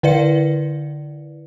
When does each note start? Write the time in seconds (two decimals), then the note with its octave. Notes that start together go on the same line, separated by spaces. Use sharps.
0.03 D3 E4 B4 D5 F5 C#7